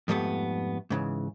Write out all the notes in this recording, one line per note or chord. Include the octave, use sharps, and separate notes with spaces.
F2 G#2 G3 A3 B3
G#2 C#3 E3